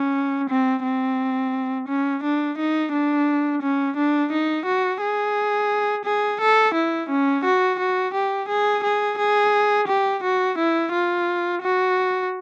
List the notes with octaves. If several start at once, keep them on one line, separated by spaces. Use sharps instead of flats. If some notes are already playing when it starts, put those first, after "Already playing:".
Already playing: C#4
C4
C4
C#4
D4
D#4
D4
C#4
D4
D#4
F#4
G#4
G#4
A4
E4
C#4
F#4
F#4
G4
G#4
G#4
G#4
G4
F#4
E4
F4
F#4